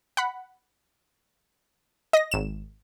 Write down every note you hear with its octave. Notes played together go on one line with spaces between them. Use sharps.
F#5 B5
D#5 A#6
G#1 E7